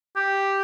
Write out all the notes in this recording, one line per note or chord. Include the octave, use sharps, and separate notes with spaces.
G4